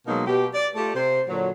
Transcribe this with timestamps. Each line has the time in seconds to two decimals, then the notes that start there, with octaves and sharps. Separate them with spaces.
0.07 B2 F#3 G#3 A#3 D#4
0.27 B2 G4
0.54 D5
0.76 A3 F4 G4 A4
0.95 C3 C5
1.28 A#2 D3 F#3